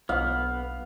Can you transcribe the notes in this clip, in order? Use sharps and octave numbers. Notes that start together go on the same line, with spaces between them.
B1 B3 F5